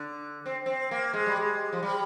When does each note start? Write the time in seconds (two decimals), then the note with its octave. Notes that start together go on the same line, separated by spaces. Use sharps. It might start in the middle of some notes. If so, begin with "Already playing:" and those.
Already playing: D3
0.46 C4
0.66 C4
0.91 A#3
1.14 G#3
1.26 G3
1.37 G#3
1.73 F3
1.83 G3